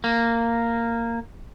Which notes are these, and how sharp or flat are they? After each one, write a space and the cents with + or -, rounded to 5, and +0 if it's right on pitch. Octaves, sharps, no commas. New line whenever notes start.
A#3 -10